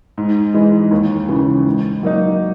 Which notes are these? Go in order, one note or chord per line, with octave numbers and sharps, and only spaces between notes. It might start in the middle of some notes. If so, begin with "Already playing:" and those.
G#2
E3 G#3
D#2
C#3 E3
G#2
F#3 A#3 D#4